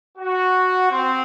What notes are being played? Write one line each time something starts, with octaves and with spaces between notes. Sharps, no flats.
F#4
C4